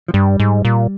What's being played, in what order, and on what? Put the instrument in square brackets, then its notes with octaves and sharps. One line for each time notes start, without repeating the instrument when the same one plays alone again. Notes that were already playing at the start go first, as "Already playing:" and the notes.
[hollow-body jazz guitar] F3
[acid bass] G2 [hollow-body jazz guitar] G3
[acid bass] G#2
A#2